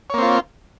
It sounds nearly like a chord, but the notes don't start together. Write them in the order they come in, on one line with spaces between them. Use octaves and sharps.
C#5 A#3 C4 F4